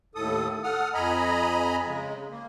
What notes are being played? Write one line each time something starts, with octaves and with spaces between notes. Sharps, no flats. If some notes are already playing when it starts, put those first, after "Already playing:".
D#2 A2 A4 D#6
A4 F#5 D#6 F6
F2 D#5 G#5 A#5 B5
C#3 G#3
A#3